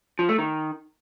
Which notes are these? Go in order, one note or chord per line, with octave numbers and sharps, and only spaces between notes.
F3
A3
D#3